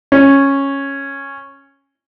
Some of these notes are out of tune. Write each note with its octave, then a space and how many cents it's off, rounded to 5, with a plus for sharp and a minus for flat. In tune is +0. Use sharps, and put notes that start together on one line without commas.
C#4 -10